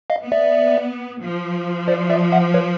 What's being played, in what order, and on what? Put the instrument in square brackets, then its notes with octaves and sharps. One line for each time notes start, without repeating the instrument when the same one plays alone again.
[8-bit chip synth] D#5 F5
[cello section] B3
[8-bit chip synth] D5 E5
[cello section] F3
[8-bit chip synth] C5 D5
D5 E5
E5 F#5
B4 C#5